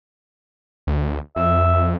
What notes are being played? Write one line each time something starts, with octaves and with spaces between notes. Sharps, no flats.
D2
F2 E5